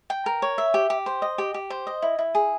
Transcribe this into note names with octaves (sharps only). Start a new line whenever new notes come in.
G5
A#4
C#5
E5
G4
G4
C5
D#5
G4
G4
C5
D#5
E4
E4
G#4